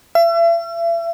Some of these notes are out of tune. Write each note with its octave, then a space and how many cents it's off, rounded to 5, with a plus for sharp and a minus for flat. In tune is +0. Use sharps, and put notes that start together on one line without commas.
E5 +40